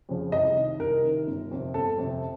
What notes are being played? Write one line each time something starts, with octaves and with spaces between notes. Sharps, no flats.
F2 C#3 F3
C2 D#5
C3 D#3
C2 A#4
C3 D#3
G1
F2 C3
G1 A4
F2 C3